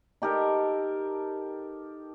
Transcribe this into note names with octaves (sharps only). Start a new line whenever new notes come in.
D#4 G4 A4 A#4